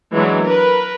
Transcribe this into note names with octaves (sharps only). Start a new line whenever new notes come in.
E3 F#3 G#3 D4
A#4 B4